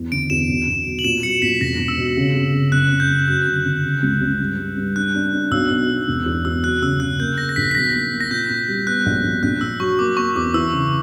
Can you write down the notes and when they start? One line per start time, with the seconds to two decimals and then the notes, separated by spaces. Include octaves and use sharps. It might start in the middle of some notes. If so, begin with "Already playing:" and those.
Already playing: E2
0.12 D3 D7
0.30 E2 E7
0.48 B1
0.68 B1
0.86 B2
0.99 F#7
1.04 A#2 E7
1.23 F#3 C#7
1.42 A#2 B6
1.61 E1 A#6
1.79 E1
1.88 E6
1.98 B2
2.17 C#3
2.34 C#3
2.53 C#3
2.72 F#1 F#6
2.91 F#1
3.00 G6
3.09 F#1
3.28 F#2 G6
3.47 D3
3.65 D3
3.85 C#3
4.03 C#2
4.21 C#2
4.40 G2
4.58 G2
4.77 G2
4.96 D4 F#6
5.14 D4
5.33 D4
5.51 B1 E6
5.70 B2
5.89 B2
6.08 E1
6.26 E2
6.45 E2 E6
6.63 F#3 F#6
6.82 C#3 E6
7.00 C#3 F#6
7.20 A#3 G6
7.38 A#3 A#6
7.49 A#6
7.56 A#1 B6
7.71 B6
7.75 B1 A#6
7.94 A#3
8.13 A#3
8.21 A#6
8.31 A#2 G6
8.49 A#2
8.68 G3
8.87 B3 F#6
9.06 A#1
9.24 A#1
9.43 A#1 F#6
9.61 A#2 E6
9.80 F#3 C#6
9.99 A#3 D6
10.17 A#3 C#6
10.35 E2 D6
10.54 E3 E6
10.73 C#3